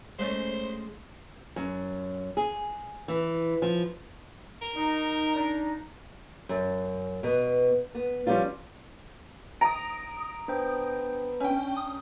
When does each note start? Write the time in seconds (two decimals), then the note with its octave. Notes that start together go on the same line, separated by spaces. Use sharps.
0.19 G#3 A3 C#4 C5
1.56 F#2
2.37 G#4
3.08 E3
3.62 F3
4.62 A#4
4.76 D#4
5.35 D4 D#4
6.49 F#2
7.23 B2 B3
7.95 B3
8.27 F3 G3 C#4 F4
9.61 A#5 D#6 D7
10.48 B3 D4 C5 G5
11.40 C#4 D4 G5
11.77 D#6